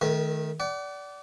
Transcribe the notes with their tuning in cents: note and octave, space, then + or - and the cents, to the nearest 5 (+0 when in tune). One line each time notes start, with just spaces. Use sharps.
D#3 +0 A3 -25 A#4 +40
D5 -20 F#5 +40